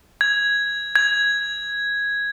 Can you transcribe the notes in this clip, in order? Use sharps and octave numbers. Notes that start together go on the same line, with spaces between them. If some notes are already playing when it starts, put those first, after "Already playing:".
G#6
G#6